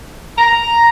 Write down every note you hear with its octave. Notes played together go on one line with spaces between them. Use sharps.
A#5